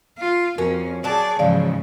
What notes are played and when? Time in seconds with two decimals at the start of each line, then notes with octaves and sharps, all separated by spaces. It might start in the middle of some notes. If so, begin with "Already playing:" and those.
0.18 F4
0.58 F2 C#4 F#4 A#4
1.04 F#3 G#4 D5 A5
1.39 G#2 C#3 E3 F3 G#3 D5 F5